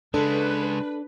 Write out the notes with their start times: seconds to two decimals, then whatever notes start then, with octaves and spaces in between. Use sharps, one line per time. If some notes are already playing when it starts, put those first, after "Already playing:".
0.14 C#3 G#3 D4 A4 B4